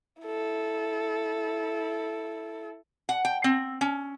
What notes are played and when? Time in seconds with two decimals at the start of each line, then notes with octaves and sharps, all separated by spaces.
0.22 E4 A4
3.09 F#5
3.25 G5
3.44 C4
3.81 C#4